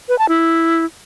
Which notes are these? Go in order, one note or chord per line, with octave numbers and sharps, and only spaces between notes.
B4
A5
E4